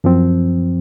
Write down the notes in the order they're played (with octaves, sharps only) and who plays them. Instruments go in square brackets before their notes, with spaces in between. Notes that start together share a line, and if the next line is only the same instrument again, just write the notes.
[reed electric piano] F#2 F3 C4